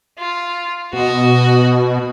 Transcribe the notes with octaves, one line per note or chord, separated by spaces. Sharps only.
F4
B2 F#4 D#5